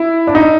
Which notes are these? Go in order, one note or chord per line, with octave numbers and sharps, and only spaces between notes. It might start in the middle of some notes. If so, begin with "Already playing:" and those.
Already playing: E4
D4
D#4